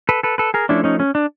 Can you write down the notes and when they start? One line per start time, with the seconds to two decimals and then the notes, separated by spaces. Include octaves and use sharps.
0.09 A4 B4
0.23 A4 B4
0.38 A4 B4
0.54 G#4 A#4
0.69 F3 A3 C#4 D4 E4
0.84 C#4 D#4
1.00 C#4
1.15 D4